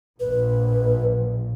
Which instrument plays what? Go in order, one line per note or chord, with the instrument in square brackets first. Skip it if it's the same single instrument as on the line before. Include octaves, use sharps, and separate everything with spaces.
[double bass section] A#1 A#2 [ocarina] B4